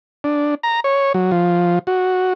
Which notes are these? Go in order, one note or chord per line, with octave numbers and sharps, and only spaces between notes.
D4
A#5
C#5
F#3
F3
F#4